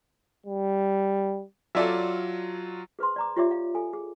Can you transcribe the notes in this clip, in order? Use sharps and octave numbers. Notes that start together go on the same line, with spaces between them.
G3
F#3 F4 A4 D5 E5
G#4 B4 C5 C6
D5 A#5 D6
F4 G4 C#5 D5 E5 D6
F5
A4 G#5
G#4